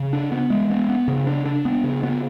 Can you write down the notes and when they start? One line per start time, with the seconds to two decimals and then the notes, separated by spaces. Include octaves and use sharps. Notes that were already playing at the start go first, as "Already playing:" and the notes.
Already playing: C#3
0.13 D4
0.32 B3
0.50 G#3
0.70 B3
0.89 B3
1.08 C#3
1.27 D4
1.45 D4
1.65 B3
1.84 C#3
2.03 B3